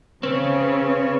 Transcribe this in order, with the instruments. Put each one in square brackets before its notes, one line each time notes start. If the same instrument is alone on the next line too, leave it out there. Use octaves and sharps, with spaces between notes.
[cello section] C#3 [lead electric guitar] C4 [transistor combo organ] C#4 [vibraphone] B4